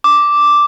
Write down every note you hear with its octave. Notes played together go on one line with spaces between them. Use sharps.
D6